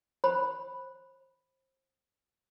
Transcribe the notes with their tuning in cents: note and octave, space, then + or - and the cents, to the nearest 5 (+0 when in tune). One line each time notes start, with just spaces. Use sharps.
C5 +25 B5 +0